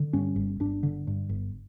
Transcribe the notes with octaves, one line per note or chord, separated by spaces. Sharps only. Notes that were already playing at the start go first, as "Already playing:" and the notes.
Already playing: D3
G2 C#4
G1
G1 D4
D3
G2
G1